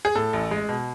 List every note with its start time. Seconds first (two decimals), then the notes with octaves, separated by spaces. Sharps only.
0.05 G#4
0.15 A2 A4
0.33 A1
0.51 G#3
0.69 B2